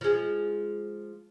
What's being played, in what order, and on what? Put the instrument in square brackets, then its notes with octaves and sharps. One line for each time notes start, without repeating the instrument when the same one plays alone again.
[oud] F3 G#3